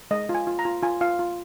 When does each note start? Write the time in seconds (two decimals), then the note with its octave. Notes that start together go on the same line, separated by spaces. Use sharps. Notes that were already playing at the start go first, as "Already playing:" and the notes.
0.11 G#3 D#5
0.29 F4
0.35 G#5
0.47 F4
0.59 A#5
0.65 F4
0.83 F4 G#5
1.01 F4 F5
1.19 F4